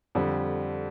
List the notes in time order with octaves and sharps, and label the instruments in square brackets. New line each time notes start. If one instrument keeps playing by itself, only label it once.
[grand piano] F2 D3 G3